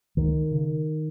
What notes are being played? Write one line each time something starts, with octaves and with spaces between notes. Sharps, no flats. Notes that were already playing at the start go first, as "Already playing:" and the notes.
C#2 D#3
C#3